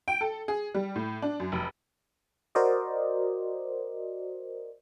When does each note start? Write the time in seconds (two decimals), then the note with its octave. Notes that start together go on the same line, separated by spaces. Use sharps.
0.08 G5
0.21 A4
0.48 G#4
0.75 G3
0.96 A2
1.22 D4
1.40 F#2
1.52 F1
2.55 F#4 A#4 C5 D5 D#5